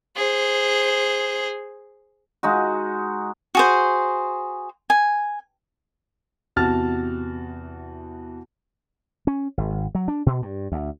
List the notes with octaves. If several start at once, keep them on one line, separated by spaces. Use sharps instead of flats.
G#4 C5
G#3 D#4 F#4
F#4 G#4 C5
G#5
E2 C3 F#4 A5 F6 A6
C#4
G#1
F#3
D4
B2
G2
D2